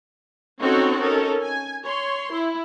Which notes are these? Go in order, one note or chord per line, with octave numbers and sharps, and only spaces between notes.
C4 C#4 D#4 F#4 A4 C#5
C#4 D#4 A4 A#4
G#5
C#5 C6
E4